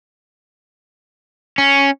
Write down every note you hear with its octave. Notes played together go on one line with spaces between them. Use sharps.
C#4